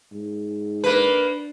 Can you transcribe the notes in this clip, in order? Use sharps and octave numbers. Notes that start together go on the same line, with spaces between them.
G#2
A#3 D4 B4